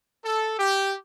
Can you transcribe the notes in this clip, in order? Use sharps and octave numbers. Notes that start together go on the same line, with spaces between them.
A4
G4